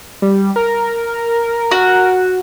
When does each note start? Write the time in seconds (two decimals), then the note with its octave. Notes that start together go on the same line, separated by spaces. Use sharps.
0.22 G3
0.56 A#4
1.71 F#4